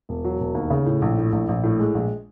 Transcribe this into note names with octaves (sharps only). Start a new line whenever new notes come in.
E1
F#3
E1
D#2
C#3
A2
A#1
A2
A#1
A#1
A2
G#3
A#1